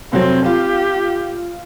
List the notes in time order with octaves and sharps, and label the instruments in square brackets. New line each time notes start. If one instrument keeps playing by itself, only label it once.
[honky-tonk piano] F1 F#3 [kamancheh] C4
[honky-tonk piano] F4 [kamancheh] G4